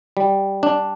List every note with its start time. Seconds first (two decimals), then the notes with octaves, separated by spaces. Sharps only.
0.17 G3
0.63 D4